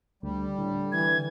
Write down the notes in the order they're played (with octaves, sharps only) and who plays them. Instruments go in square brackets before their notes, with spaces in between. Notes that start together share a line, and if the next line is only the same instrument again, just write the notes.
[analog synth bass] D2 [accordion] G3
[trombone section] A2 [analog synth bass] D3
[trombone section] E3 [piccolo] G#6